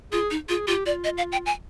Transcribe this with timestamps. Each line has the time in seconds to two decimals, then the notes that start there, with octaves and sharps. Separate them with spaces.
0.12 F4 G#4
0.31 D#4
0.48 F4 G#4
0.67 F4 G4
0.85 F4 D5
1.04 D#5
1.18 F5
1.32 G5
1.46 G#5